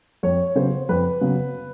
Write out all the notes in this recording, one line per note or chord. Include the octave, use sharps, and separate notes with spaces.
F2 C#5
C#3 F#3 B3 C5
F2 B4
C#3 F#3 B3